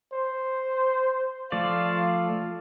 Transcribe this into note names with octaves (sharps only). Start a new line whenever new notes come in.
C5
F3 A3 D5 F5